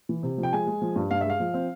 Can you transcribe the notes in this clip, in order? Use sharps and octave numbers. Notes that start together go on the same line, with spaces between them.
E3
C3
F3
G5
G#3 G#5
G#3
F3
G2
G2 F5
E5
G#3 F5
F3
C4